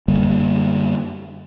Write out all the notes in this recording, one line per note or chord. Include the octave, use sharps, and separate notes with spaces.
F#2 D3 G3 A#3